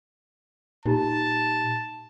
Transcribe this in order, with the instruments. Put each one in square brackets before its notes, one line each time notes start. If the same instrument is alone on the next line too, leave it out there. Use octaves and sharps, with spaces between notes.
[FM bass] A#2 [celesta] D#4 G4 A#5 [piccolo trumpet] A5